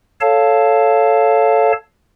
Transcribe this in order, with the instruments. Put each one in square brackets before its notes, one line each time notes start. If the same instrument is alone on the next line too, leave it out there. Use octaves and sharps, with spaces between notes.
[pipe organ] A4 C#5 F5 A5